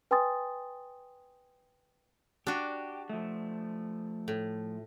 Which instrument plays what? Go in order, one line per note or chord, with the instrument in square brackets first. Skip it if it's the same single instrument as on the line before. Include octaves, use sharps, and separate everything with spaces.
[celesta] B4 G5 G#5 C6 D#6 A6
[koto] D4 F#4 [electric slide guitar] G4
[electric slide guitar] F3 A3
[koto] A2